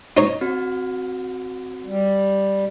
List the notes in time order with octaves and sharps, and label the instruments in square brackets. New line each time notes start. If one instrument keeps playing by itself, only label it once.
[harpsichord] D#4 C#5
[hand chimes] C4 F#4
[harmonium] G3